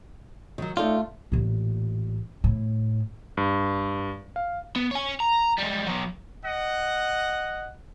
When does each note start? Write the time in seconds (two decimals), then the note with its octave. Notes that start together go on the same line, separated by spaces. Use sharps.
0.58 D#3 F#3
0.77 A3 D#4 F4 A4 D5
1.32 A1 A#2
2.44 A2
3.37 G2
4.36 F5
4.76 B3
4.91 C#5 G#5
5.20 A#5
5.58 G3 G#3
5.87 F#3 B3
6.43 D#5 F#5